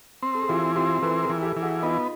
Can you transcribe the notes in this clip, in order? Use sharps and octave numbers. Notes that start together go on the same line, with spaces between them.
C4
A4
G#4
E3 F4 G4
C4 F4 G4
E3 A4 B4
G#4 A#4
E3
G4 A4
E3
F#4 G#4
B3 D#4 F4